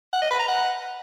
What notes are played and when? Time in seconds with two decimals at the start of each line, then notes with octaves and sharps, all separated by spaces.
0.13 F#5
0.22 D#5
0.31 B4
0.39 A#5
0.48 F#5